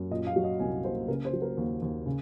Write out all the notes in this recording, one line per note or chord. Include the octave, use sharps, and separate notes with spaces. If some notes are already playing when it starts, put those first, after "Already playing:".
Already playing: F#2
A#2 D#5
F5
F#3
D#5
C2 G#5
A#3 C5
C#3 A#4
C5
F#3
A#4
D#2
D#2
C#3